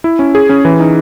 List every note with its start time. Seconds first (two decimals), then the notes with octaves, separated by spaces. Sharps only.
0.04 E4
0.19 C#4
0.35 G#4
0.49 C#4
0.65 E3
0.80 D#4